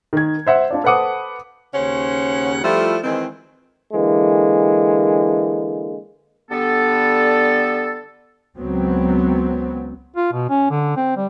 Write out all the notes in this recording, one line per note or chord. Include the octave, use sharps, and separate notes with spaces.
D#3 G#6
C5 E5 F#5
D4 F4 D5
A4 B4 C5 F#5 D6 D#6
D#2 C#3 C#4 C5 C#5 F#5
F3 G3 A3 E4 F4 A4
D#3 E3 G#3 C4
D3 E3 G#3 A#3
D3 G3 B3 A4
C#2 F#3 B3 C4
F4
B2
C#4
D3
C4
G3